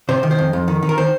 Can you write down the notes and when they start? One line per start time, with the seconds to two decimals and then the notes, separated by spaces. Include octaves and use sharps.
0.09 C3 C5
0.23 D#3
0.31 C5
0.38 F2
0.53 F2
0.68 D#3
0.83 D#3
0.89 A#4
0.97 D#3 C5